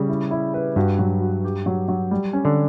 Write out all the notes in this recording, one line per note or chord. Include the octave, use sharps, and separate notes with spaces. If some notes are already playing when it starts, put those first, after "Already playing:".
Already playing: C#3 G3
E4
E4
B4
G2 F#4
F#3
F#4
G4
F#3
F#3
G3
C#4
D3